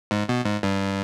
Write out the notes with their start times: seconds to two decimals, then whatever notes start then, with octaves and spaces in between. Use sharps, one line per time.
0.11 G#2
0.29 B2
0.45 G#2
0.63 G2